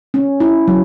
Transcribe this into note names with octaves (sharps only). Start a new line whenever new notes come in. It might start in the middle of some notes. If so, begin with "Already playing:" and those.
C#4
E4
F#3